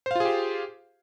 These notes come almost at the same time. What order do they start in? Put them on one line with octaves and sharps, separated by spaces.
C5 F5 F4 G#4 G4